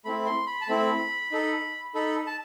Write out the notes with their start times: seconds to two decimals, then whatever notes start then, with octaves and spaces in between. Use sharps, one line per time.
0.05 A3 C4 E4 B5
0.26 C6
0.47 B5
0.61 A5
0.68 A3 C4 E4 B5
1.31 D#4 A4
1.95 D#4 A4 B5
2.27 A5